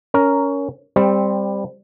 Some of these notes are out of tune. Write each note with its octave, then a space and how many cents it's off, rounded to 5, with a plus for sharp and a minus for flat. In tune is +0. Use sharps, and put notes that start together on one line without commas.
C#4 +15 A#4 +0
G3 +15 C4 +0